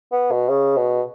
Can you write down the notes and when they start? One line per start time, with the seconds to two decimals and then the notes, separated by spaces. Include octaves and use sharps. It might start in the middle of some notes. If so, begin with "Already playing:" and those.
0.12 B3
0.31 B2
0.49 C#3
0.77 B2